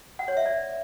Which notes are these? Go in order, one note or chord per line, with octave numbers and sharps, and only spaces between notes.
F#5
C#5
E5
D5